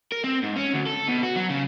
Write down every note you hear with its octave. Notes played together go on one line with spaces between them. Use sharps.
A#4
C4
G#2
C#4
D2
A4
B2
F#4
F#3
C#3